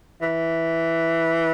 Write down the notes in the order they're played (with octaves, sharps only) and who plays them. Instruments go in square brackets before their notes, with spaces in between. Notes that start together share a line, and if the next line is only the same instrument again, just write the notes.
[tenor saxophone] E3